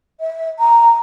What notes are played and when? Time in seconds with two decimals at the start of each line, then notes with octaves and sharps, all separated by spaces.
0.20 E5
0.59 A#5